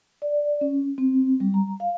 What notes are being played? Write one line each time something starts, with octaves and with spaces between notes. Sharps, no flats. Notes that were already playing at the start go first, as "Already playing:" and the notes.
D5
C#4
C4
G3
A#5
F5